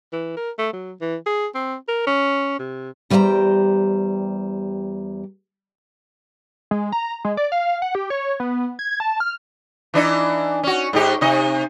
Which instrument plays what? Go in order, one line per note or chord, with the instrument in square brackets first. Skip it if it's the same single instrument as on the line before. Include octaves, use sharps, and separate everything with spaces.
[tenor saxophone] E3
A#4
A3
F#3
E3
G#4
C4
A#4
C#4
C3
[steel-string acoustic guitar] E2 G3 G4 C5 D#5 A#5
[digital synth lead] G#3
A#5
G#3
D5
F5
F#5
G4
C#5
B3
G#6
A5
F6
[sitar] E3 D4 D#4
C#4 F#4
G#2 D#4 G4
C3 D#4 D#5